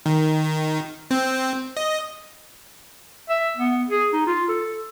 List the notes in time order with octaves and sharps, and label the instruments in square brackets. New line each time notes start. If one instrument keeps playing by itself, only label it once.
[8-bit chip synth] D#3
C4
D#5
[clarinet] E5
B3
G#4
D#4
F4
A4